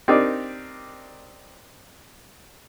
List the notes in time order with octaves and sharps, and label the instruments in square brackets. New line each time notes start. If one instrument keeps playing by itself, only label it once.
[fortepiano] C4 D4 D#4 G4 A#4 D5